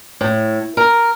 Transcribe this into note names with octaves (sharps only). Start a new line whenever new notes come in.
A2
A#4